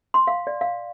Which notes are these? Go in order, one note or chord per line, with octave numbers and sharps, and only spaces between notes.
C6
F5
D5
F5